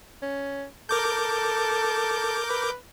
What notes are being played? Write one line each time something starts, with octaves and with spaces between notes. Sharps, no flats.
C#4
A4 A#4 D6 G6
B4